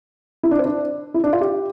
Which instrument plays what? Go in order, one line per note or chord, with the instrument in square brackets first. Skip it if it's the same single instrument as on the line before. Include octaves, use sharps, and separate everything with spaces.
[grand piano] E4
D4
C4
D4
E4
D4
F4
G4